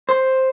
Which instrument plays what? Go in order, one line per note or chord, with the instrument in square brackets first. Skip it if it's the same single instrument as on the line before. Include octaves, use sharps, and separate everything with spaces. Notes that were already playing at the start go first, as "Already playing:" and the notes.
[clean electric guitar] C5